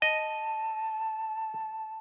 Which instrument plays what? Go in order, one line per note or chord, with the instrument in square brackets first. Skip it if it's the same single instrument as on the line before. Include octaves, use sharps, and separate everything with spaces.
[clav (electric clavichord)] D#5 [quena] A5